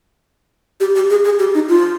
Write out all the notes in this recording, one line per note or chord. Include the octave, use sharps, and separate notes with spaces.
G4
G4
G#4
G#4
G4
D#4
F4